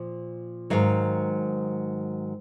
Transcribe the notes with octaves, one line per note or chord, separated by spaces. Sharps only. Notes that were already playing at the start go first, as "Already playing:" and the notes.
Already playing: A#2 F3
G#2 D#3 F#3 F5